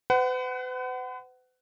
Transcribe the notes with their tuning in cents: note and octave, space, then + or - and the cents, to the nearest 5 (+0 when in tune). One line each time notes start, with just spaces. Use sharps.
B4 +45 F#5 +20